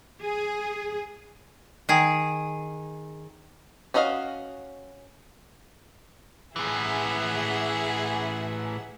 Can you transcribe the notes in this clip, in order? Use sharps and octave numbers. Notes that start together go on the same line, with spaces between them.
G#4
D#3 G#4
C#4 D4 F#4 D#5 F5
A2 E3 G#4 E5 F#5